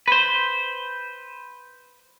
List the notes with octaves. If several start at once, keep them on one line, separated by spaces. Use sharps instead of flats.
B4 C5